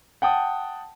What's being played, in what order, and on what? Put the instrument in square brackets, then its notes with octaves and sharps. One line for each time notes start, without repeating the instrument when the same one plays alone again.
[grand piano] F#5 G5 A5 D#6